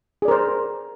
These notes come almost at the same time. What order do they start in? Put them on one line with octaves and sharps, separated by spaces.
G#4 D5 A#4 C5